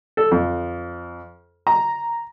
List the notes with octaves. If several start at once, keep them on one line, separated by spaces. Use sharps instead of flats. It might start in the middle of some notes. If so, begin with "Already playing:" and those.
A4
F2
A#5